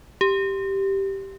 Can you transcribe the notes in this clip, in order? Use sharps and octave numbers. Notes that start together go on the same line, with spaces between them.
G4